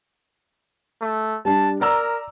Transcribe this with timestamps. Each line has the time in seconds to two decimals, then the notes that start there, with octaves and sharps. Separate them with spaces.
1.01 A3
1.45 G3 D4 A5
1.81 A#4 D5 A#5 E6